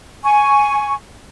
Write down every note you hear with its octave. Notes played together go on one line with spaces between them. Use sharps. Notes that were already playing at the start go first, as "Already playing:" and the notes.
G#5 C#6